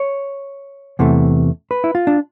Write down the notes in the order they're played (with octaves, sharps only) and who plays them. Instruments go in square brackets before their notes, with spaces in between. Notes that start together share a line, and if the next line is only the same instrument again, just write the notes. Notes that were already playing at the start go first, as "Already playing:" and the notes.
Already playing: [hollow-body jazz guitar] C#5
E2 C3 E3 A3
B4
E4
F4
D4